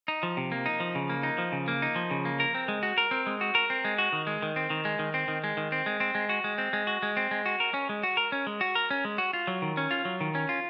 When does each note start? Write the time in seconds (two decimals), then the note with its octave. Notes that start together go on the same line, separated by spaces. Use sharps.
0.08 D#4
0.23 F3
0.37 C3
0.52 A#3
0.66 D#4
0.80 F3
0.95 C#3
1.10 A#3
1.23 D#4
1.38 F3
1.52 C#3
1.68 A#3
1.82 D#4
1.96 F3
2.11 C#3
2.25 A#3
2.40 A#4
2.55 C4
2.68 G#3
2.83 F#4
2.98 A#4
3.11 C4
3.27 G#3
3.41 F#4
3.55 A#4
3.70 C4
3.85 G#3
3.98 F#4
4.13 D#3
4.27 G#3
4.42 D#3
4.56 C4
4.70 D#3
4.85 G#3
4.99 D#3
5.14 C4
5.28 D#3
5.44 G#3
5.57 D#3
5.72 C4
5.86 G#3
6.00 C4
6.15 G#3
6.29 F#4
6.44 G#3
6.58 C4
6.73 G#3
6.87 F#4
7.03 G#3
7.17 C4
7.31 G#3
7.46 F#4
7.60 A#4
7.74 C#4
7.89 G#3
8.03 F#4
8.17 A#4
8.32 C#4
8.47 G#3
8.61 F#4
8.75 A#4
8.90 C#4
9.05 G#3
9.18 F#4
9.33 F4
9.47 F#3
9.62 D#3
9.77 C#4
9.91 F4
10.05 F#3
10.21 D#3
10.35 C#4
10.49 F4